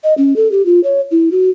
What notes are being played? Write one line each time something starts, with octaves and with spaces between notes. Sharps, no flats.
D#5
C#4
A4
G4
F4
C#5
E4
F#4